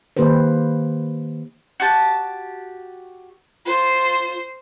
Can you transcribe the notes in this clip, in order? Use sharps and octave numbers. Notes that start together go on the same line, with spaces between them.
D#3 A#3 G4 B4 C5
F#4 G4 A5
F4 C5